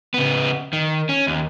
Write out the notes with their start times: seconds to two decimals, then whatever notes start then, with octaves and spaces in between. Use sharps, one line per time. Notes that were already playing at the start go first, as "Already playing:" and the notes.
0.14 C#3 B3
0.73 D#3
1.09 C#4
1.27 D#2